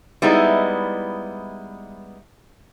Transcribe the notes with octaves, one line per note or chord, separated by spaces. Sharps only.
G3 G#3 B3 D#4 E4